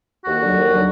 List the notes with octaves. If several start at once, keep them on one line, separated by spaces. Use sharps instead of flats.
D#2 F#4
D3 F#3
D#2
D3 F#3